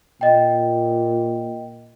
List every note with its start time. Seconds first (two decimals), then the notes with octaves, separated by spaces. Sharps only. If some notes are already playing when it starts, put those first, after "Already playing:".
0.21 A#2 D#5 G5